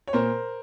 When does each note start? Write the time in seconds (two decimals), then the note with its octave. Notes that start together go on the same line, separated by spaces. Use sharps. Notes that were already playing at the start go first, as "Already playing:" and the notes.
0.07 C#5
0.13 A#2 A#4 C5